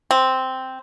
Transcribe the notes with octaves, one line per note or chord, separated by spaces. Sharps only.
C4